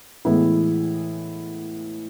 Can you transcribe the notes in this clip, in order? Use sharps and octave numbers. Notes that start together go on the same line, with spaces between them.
A2 E3 G#3 B3 E4